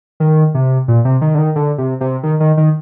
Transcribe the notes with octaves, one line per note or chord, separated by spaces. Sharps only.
D#3
C3
A#2
C3
D#3
D3
D#3
D3
C3
C3
D#3
D#3
D#3